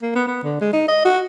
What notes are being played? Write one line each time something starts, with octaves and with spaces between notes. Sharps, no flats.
A#3
B3
B3
D3
G#3
D#4
D#5
F#4